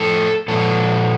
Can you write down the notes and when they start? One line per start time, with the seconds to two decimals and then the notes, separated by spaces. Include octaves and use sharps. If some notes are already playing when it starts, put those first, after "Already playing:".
Already playing: A2 F3 A4
0.48 A#2 F3 A4